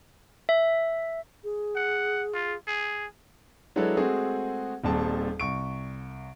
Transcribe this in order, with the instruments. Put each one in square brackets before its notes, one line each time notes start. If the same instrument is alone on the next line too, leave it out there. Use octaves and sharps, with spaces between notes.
[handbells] E5
[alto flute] G#4
[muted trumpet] F#5
F4
G#4
[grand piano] F#3 G#3 D4 E4 A4 B4
G#3 A3 C4 F#4 G#4
D#1 D#2 G3 C4 G#4 A5
C2 C#6 D7